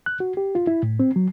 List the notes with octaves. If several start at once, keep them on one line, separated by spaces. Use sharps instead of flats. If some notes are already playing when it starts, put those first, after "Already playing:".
F#6
F#4
G4
F4
E4
A2
C4
F#3